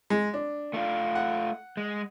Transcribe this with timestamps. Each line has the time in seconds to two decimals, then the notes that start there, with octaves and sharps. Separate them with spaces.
0.10 G#3
0.34 D4
0.74 A3 F4
1.15 F#5
1.77 G#3